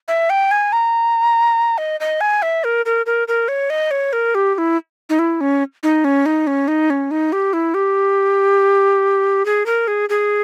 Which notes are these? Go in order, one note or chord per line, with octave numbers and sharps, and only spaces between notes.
E5
G5
G#5
A#5
D#5
D#5
G#5
E5
A#4
A#4
A#4
A#4
C#5
D#5
C#5
A#4
G4
G4
E4
D#4
E4
C#4
D#4
C#4
D#4
C#4
D#4
C#4
D#4
G4
E4
G4
G#4
A#4
G#4
G#4